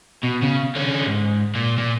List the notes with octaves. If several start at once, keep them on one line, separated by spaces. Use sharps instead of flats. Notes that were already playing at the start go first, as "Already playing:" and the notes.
B2
C#3
D3 C#4
G#2
A#2
A#2